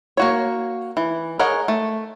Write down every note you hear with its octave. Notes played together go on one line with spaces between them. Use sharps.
A#3 F#4 C#5
E3
G#4 A#4 C#5 D#5 F#5
A3